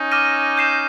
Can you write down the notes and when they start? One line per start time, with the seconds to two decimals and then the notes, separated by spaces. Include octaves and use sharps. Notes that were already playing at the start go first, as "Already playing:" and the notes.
Already playing: C#4 D#4
0.12 D6 F6 A#6 D#7
0.57 G6 C7 E7